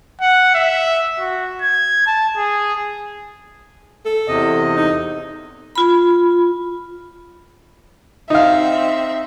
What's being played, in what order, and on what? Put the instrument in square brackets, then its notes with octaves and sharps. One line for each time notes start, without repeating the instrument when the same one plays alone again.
[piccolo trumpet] F#5
E5
F#4
G#6
A5
G#4
[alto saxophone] A4
[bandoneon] E2 C3 D#5
[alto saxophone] D#4
[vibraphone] F4 B5
[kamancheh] C4 E5 [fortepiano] D#4 F5